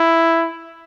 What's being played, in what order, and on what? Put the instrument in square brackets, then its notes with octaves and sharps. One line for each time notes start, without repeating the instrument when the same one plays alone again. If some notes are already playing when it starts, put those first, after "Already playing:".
Already playing: [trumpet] E4